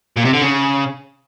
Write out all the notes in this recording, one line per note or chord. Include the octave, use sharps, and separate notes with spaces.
A#2
C3
D3
C#3